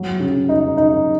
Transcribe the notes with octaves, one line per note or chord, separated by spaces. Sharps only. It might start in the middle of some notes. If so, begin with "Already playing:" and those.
Already playing: F#3
C#3
D#4
D#4